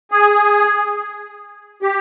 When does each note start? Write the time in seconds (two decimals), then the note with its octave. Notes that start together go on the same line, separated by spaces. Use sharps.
0.11 G#4
1.82 G4